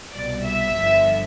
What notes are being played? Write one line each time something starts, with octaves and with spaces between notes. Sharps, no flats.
C2 B2 G3 D5
E5
G1 G2 D3 F3